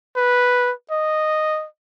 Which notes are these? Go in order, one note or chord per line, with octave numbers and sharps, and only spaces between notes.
B4
D#5